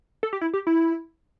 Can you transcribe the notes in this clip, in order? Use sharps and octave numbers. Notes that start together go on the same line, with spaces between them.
A4
G4
E4
G4
E4